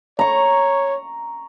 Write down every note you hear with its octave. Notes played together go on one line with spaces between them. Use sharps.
C#5 A#5 C#6